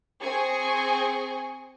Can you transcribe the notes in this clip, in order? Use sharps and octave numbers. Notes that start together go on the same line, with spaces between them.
C4 G#4 G#5 C#6